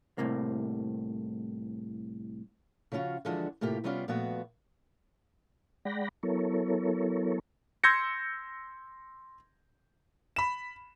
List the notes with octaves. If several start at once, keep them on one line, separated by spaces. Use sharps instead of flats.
C2 A2 C3 A#3
C#3 F3 C#4 F4 F#4
D3 E3 F3 G#3 D4 F#4
A2 C3 A#3 F4 G4
C3 G3 B3 C#4 F4 D5
A#2 F3 A3 B3 F#4 B4
G#3 D5 F#5 G5 B5 A#6
F#3 B3 E4 A4 A#4 C#5
C6 E6 G6 G#6 A#6 C#7
B5 E7